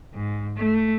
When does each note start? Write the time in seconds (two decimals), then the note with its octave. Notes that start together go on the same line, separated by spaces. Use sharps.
0.14 G#2
0.57 A3